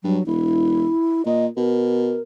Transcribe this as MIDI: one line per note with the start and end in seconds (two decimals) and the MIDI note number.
0.04 0.19 43
0.04 0.23 54
0.26 0.87 28
0.26 1.25 64
1.26 1.48 46
1.26 1.46 75
1.57 2.18 47
1.57 2.21 70